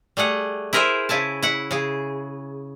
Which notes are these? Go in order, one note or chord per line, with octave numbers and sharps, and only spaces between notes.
G3 A3 G#4 F#5
E4 G#4 A#4 C5 E5
C#3 E4 G#5 A5
E4 F#5
C#3 G#4